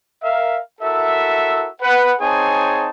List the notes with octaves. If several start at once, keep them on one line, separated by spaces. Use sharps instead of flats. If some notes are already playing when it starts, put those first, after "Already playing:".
A#4 E5 F5
E4 F#4 A4 A#4 E5
B4 F#5
C4 D#4 G#4 C#5 G#5 A5